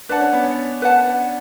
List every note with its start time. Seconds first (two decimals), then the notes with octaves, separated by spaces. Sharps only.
0.09 D4 B4 F#5 A5
0.21 C#4
0.33 B3
0.44 C#4
0.82 B4 F#5 A5